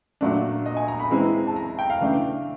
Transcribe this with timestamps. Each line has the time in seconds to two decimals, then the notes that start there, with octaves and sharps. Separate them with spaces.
0.21 A#2 F#3 A3 D4
0.66 D#5
0.77 G#5
0.88 A#5
1.00 B5
1.11 E3 G#3 C4 E4
1.47 A5
1.56 A#5
1.79 G5
1.90 F5
2.01 C#3 E3 A3 D4